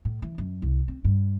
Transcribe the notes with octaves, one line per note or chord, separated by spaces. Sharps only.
A2
E3
F#2
C2
C4
G2